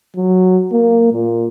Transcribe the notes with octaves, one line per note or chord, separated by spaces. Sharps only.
F#3
A#3
A#2